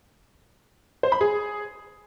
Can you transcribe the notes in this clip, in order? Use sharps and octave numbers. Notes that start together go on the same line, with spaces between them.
C5
B5
G#4